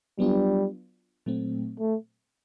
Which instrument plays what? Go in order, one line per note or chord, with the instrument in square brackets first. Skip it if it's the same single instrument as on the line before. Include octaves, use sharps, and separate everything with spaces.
[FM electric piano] F#3 B3 D4 F4 [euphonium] G3
[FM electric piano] A#2 F#3 A3 C4
[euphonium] A3